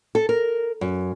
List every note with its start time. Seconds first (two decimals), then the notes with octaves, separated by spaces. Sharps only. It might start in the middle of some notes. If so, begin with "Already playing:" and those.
0.15 A4
0.29 A#4
0.81 F#2